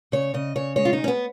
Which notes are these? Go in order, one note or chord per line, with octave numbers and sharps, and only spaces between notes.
C#3 C#5
C#3 D#5
C#3 C#5
G#3 C#5
F4
G#3 D#4
C#4
B3